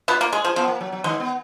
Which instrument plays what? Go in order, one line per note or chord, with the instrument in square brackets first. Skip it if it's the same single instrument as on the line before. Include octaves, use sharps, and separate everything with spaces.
[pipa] B2 B3 [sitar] F4
[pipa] A#3
[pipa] G#3 [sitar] G#4
[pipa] F3
[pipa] F3 [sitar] B3
[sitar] A#3
F#3
F#3
[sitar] D#3 [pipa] G#3
[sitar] B3